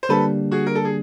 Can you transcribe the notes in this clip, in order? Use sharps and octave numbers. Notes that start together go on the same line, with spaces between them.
C5
D3 G3 A#3 D4 G4 A4 B4
F#4 G#4
A#4
A4
G#4